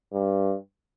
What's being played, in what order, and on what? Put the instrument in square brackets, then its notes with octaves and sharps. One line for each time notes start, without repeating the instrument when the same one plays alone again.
[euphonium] G2